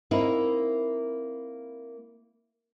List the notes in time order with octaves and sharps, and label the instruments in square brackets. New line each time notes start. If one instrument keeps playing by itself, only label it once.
[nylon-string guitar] A#3 C4 D#4 E4